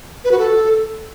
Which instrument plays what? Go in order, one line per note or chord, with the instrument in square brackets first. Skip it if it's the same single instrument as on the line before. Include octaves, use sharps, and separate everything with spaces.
[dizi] B4
F#4
A4